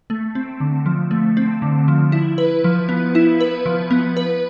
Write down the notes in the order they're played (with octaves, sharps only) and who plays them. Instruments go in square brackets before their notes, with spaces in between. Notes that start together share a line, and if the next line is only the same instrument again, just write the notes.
[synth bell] A3
C4
D3
F3
A3
C4
D3
F3
E4
B4
F3
B3
E4
B4
F3
B3
B4